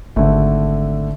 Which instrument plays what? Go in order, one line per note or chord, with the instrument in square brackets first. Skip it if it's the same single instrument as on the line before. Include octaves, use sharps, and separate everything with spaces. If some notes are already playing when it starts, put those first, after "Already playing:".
[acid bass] G#1 [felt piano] D3 A3